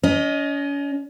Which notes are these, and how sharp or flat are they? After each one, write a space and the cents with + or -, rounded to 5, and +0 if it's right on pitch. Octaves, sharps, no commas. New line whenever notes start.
C#4 +35 D#5 +0